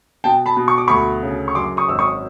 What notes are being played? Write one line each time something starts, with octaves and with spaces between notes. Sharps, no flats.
B2 G5 A5
A5 B5
B2
C#6
D6
D2 B5 C#6
C#3
C#6
F#2 C6 D6
C#6 D#6
G#1 E6
C#6 D#6